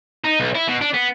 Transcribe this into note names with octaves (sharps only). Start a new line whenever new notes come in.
D#4
B1
E4
B2
D4
B3